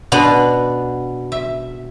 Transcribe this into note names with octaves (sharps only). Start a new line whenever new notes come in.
B2 B3 D4
E5